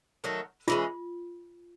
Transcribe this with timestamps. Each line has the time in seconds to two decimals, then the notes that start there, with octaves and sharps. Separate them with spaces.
0.24 D#3 F#3 A3
0.68 E3 G#3 C#4 F4